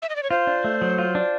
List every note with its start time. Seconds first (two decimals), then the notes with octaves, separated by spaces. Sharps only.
0.02 E5
0.09 D#5
0.16 D5
0.23 C#5
0.31 F4 C5
0.47 D4
0.64 A3
0.82 F#3
0.98 F4
1.15 D4